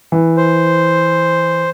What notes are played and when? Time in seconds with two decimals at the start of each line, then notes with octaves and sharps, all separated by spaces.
0.12 E3
0.37 C5